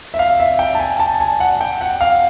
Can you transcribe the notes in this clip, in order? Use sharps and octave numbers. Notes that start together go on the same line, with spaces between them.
E5
F5
E5
G5
A5
G#5
A5
G#5
F#5
G5
F#5
F5